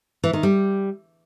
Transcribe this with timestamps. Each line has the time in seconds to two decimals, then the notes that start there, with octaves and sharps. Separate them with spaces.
0.24 E3
0.33 D#3
0.43 G3